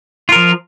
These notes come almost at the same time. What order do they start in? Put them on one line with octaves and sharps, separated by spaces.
F4 A#4 F3